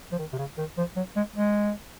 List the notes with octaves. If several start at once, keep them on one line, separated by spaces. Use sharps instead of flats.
F3
D#3
C3
C#3
D#3
F3
F#3
G#3
G#3